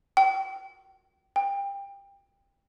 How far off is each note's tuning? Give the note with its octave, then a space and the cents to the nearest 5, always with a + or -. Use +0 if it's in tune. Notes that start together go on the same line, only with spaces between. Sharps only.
G5 -25
G5 +25